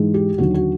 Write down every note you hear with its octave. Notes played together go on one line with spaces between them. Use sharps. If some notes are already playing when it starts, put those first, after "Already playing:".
Already playing: G#2 E3 G#3
G4
D#2 D3 F#3 F#4
F#4